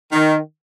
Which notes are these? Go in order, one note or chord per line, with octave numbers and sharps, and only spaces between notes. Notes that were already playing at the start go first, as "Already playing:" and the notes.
D#3